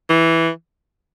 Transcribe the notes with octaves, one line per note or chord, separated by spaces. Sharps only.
E3